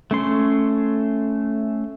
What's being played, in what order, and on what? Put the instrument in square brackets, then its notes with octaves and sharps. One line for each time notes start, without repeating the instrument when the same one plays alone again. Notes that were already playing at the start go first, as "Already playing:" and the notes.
[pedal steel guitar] A3 C#4 C6